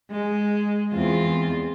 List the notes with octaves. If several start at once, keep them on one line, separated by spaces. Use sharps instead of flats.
G#3
E2 C4 F4